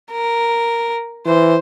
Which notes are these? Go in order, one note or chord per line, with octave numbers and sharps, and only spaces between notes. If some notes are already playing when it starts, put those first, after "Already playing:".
A#4
E3 C5